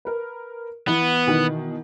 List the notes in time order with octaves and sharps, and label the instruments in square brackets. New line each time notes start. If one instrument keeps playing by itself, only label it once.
[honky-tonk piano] A#4 B4
[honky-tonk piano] E3 [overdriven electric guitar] B3
[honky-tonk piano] B2 D#3 E3